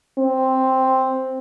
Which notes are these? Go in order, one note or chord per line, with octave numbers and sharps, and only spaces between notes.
C4